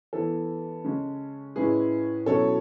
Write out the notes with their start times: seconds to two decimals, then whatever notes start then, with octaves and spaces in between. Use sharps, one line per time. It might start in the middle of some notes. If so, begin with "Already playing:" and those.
0.13 E3 B3 E4 A4
0.84 C#3 G#3 C#4
1.56 A2 G#3 C#4 E4 G#4 B4
2.26 B2 F#3 C#4 E4 A4 C#5